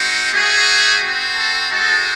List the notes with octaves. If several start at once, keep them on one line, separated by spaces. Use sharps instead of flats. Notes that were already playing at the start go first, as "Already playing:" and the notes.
Already playing: G#3 C4 D#4 F#4
A3 D#4 F#4 G#4
C4 F#4
A4
G#3 D#4 F#4 A4